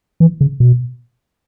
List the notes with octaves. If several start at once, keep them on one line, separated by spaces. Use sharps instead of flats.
E3
C#3
B2